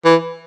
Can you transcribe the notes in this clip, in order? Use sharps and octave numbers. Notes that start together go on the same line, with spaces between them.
E3